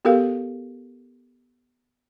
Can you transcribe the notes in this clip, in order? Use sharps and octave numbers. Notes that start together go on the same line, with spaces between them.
B3 F#4 G4 A4 A#4 F5